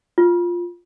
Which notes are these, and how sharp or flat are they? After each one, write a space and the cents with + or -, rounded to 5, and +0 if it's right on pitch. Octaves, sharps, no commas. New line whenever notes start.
F4 +5